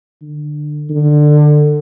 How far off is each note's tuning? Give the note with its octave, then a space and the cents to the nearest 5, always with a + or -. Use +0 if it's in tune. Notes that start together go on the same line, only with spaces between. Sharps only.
D3 +25
D3 +20